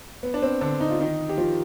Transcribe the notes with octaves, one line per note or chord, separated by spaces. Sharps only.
B3
D4
C4
D3 D4
D#4
F4
D#3 D#4
G4
F3 F4